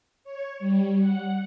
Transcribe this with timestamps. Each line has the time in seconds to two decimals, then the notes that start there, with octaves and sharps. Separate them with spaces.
0.24 C#5
0.59 G3
0.99 F#5